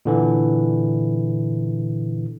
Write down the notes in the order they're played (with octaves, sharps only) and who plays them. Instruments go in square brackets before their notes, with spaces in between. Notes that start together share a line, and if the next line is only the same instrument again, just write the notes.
[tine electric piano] A#2 D3 E3